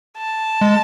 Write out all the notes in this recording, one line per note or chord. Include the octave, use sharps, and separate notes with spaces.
A5
G#3